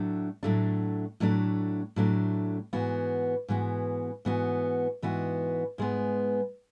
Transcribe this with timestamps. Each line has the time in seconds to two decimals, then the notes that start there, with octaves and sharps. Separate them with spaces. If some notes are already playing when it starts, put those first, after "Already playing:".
Already playing: A2 F#3 A3 D4
0.43 A2 F#3 A3 D4
1.20 A2 F#3 A3 D4
1.96 A2 F#3 A3 D4
2.73 G#2 E3 B3 F#4
3.48 G#2 E3 B3 F#4
4.25 G#2 E3 B3 F#4
5.02 G#2 E3 B3 F#4
5.78 G#2 G#3 B3